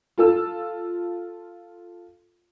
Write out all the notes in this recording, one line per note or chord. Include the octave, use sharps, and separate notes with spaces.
F4 A4 E6